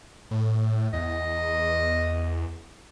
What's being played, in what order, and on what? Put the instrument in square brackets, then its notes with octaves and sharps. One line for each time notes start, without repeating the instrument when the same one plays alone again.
[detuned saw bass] A2
[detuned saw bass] E2 [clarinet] D#5